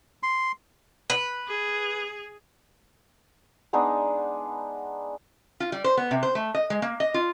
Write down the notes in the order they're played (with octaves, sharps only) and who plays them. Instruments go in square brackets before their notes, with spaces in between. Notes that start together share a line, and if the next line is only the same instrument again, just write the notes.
[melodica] C6
[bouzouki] B4
[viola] G#4
[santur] G#3 B3 D4 D#4
[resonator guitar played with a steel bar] F4
G3
C5
B3
C3
C5
A3
D#5
G#3
A#3
D#5
F4